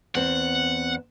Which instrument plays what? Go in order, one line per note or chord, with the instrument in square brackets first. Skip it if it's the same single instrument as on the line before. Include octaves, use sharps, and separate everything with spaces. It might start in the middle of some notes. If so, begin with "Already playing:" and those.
[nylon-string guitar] E2 C4 [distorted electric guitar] F#5